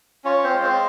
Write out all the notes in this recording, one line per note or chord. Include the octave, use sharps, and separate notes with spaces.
C#4 F4 C#5
C4 C5
G#3 C#5
C4 C5